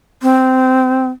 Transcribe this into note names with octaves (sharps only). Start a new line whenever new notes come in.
C4